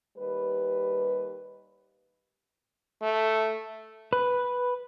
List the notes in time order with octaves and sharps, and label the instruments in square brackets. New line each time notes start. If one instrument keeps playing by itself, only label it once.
[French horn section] D#2 G3 B4
[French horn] A3
[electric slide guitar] B4